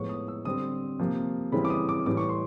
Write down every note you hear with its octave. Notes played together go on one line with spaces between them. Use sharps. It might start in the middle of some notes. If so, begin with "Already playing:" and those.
Already playing: A2 F3 G#3 B3 C#6
D#6
E6
D3 G3 C4 D#6
C3 F3 A#3
C#3 E3 G3 C4 B5
D6
D#6
D6
A2 E3 G3 D6
C#6
C6